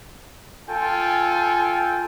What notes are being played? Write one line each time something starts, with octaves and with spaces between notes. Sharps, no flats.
F4 A4 G5 G#5